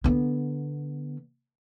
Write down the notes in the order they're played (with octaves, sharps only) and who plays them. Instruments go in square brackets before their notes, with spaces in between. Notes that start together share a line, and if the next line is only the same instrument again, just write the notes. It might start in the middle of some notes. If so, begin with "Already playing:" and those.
[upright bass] D3 B3